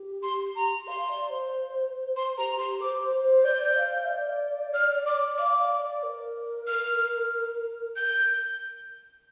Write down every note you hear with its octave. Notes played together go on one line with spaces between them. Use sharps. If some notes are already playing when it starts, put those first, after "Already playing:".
Already playing: G4
C6
A#5
F5 C6
D5
C5
C5 C6
G4 A#5
G4 C6
C5 D6
C5
D5 G6
F5
D5
F6
D6
F5 D6
D5
D5
A#4
F6
G6